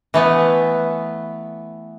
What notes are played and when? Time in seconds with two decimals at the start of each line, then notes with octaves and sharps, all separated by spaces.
0.14 E3 A3 B3